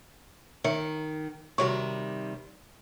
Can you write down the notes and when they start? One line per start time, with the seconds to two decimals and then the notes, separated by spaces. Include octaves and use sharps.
0.64 D#3 C#5 E5 C#7
1.58 C3 D#3 G3 F#4 C#5 C#6